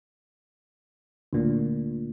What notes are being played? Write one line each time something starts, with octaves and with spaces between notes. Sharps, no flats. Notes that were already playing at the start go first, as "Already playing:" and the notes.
D2 A#2